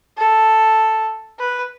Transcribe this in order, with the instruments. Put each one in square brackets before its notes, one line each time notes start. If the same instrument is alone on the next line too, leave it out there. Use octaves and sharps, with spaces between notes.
[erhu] A4
B4